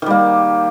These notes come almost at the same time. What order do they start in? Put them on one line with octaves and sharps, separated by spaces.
D#3 G3 A#3